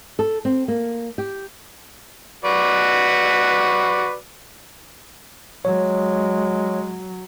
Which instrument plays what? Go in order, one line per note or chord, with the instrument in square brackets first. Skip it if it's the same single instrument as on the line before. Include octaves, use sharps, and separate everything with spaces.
[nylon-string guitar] A4
C4
A#3
G4
[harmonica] F#4 B4 D5
[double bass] F#3 [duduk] G#3 [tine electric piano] C#5